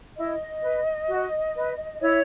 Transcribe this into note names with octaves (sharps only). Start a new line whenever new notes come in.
E4 D#5
B4
F#4
B4
E4 C#5